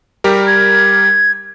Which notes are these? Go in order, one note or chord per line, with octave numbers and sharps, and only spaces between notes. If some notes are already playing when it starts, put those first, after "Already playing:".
G3 G4 A#4
G#6